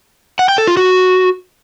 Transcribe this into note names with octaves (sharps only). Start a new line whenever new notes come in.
F#5
G5
A4
F4
F#4